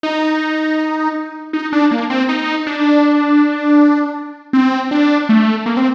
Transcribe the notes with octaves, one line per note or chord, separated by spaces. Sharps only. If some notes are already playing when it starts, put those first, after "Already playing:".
D#4
D#4
D4
A#3
C4
D#4
D4
C4
D4
A3
A#3
C4